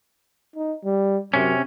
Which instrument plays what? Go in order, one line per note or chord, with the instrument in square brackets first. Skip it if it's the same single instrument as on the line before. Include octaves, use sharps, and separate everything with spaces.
[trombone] D#4
G3
[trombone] F#2 [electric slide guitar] C3 C#4